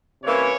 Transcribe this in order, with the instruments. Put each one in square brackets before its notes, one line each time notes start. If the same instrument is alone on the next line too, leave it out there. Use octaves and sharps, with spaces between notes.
[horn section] C3 E3 A#3 C#4 E4 C#5